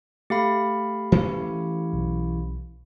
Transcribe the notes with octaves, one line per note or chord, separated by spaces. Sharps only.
A3 G4 F5 B5
E3 C#4
B1